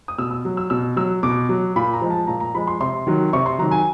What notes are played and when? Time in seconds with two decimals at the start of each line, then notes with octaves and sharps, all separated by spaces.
0.08 D#6
0.18 B2 E6
0.31 E6
0.45 F#3
0.57 E6
0.70 B2 E6
0.96 F#3 E6
1.23 B2 D6
1.49 F#3
1.76 A#2 B5
1.93 A#5
2.01 F3 G#3
2.10 A5
2.27 A#2 A#5
2.40 A#5
2.55 F3 G#3 B5
2.67 C6
2.80 C3 C6
3.07 D#3 F#3
3.33 C3 C#6
3.46 C6
3.58 D#3 F#3 A#5
3.71 G#5